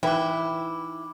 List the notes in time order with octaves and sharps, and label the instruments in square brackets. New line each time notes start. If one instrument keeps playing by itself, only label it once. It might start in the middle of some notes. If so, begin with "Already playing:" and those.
[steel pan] E3 B4 [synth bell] D#4 B5 D6 [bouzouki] E4 [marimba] G5